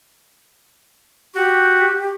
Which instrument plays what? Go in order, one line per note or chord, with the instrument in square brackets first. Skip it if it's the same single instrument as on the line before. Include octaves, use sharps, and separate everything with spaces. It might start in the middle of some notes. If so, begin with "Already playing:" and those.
[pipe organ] F#4 [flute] G4